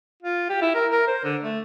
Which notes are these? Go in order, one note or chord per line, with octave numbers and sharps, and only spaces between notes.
F4
G4
E4
A#4
A#4
C5
D3
A3